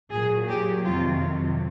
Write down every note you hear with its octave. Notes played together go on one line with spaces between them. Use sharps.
A#2 F#3 G#4
G4
F2 C3 D#3 F#3 F4